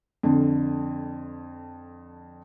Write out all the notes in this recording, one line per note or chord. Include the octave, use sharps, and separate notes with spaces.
F2 D3